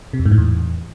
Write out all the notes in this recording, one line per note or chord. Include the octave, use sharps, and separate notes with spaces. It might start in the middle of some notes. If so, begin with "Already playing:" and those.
C3
F2
G#2
A2
E2